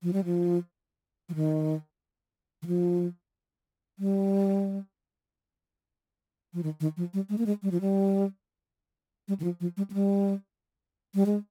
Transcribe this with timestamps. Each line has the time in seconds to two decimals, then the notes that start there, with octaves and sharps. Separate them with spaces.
0.03 F3
0.13 G3
0.25 F3
1.29 F3
1.35 D#3
2.62 D#3
2.67 F3
3.99 G3
6.54 F3
6.63 D#3
6.80 D#3
6.97 F3
7.14 G3
7.29 G#3
7.38 A#3
7.46 G#3
7.63 G3
7.71 F3
7.81 G3
9.28 G3
9.40 D#3
9.44 F3
9.60 F3
9.77 G3
9.90 G#3
9.93 G3
11.15 G3
11.26 G#3